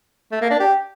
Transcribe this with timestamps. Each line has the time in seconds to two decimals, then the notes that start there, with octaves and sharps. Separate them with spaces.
0.32 A3
0.41 A#3
0.50 D4
0.60 G4